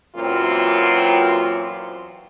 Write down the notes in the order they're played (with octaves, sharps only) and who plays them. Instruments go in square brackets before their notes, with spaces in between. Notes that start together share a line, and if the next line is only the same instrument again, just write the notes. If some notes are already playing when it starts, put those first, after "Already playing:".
[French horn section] F#2 A#2 E3 F#3 C4 F4